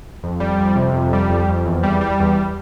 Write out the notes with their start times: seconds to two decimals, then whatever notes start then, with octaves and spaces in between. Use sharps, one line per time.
0.24 F2
0.40 G3
0.58 F2
0.76 C3
0.94 F2
1.13 G3
1.30 F2
1.49 F2
1.66 E2
1.83 G3
2.01 G3
2.20 E2